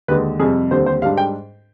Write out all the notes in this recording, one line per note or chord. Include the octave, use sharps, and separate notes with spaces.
D#2 D3 G#3 B4
F2 C3 G3 G#4
D#2 D3 G3 C4 C5
C5
G#2 G3 D4 F5
G5